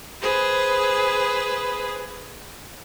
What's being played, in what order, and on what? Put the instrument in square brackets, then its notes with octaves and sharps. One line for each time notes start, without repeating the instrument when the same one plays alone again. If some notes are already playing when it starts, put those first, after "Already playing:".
[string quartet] G#4 B4 C5